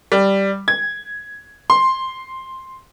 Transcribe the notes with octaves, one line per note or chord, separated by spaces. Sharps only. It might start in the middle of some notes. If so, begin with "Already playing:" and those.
G3
G#6
C6